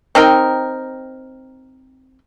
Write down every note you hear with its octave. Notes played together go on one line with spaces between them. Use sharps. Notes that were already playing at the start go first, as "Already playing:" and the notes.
C4 D#4 A#4 G5